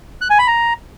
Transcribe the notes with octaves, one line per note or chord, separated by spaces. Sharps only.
F#6
G#5
B5
A#5